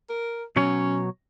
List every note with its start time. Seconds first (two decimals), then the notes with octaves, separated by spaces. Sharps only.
0.09 A#4
0.56 B2 F#3 C#4 C#5